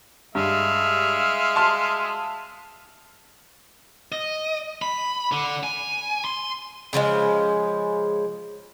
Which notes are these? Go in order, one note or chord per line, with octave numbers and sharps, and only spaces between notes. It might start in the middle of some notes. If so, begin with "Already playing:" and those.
G2 G#3 E5 F5
A5 C6 F6
D#5
B5
D3
G#5
C6
C#3 F3 F#3 G#3